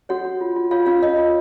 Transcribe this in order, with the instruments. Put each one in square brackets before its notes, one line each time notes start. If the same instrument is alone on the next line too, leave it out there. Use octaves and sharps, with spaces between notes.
[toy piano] F#4 C#5 F#5
F#4
F4
F4
F4 C#5 F5
C#4 F4 F5
C#5 D#5
F4